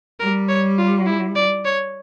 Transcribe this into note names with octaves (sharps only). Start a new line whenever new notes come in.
G3 A#4
C#5
F4
E4
D5
C#5